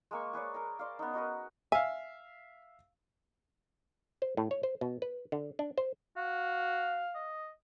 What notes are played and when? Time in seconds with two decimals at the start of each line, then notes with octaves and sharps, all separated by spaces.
0.11 G#3 A#3 C#6
0.33 G#4 B4 C#5 D5
0.54 A#4 G#5 A#5
0.79 C5 D5 F5
0.99 B3 C#4 D#4
1.14 D#4 F#4 A#4 B4
1.72 E5 F5 G#5
4.22 C5
4.37 A2
4.51 C#5
4.63 C5
4.81 B2
5.02 B4
5.32 D3
5.59 D4
5.78 C5
6.17 F#4 F5
7.15 D#5